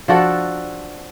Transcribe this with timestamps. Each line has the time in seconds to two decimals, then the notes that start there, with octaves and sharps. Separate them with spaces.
0.08 F3 D4 F#4 A4